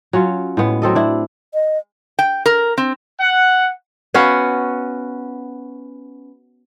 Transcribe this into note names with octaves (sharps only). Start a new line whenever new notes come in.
F#3 C#4 F4
A2 G#3 B3
F#3 C4 A4 D#5
D4 E4
D#5
G5
A#4
C4
F#5
B3 C#4 F#4 F5